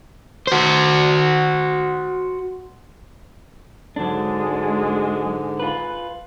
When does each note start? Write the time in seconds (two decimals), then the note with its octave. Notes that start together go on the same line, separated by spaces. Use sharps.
0.47 F#4 C5
3.96 G#2 D3 F#3 G#3 D4
5.60 F4 B4